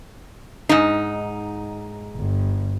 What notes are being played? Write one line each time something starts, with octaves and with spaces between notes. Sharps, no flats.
G#2 D#4
G1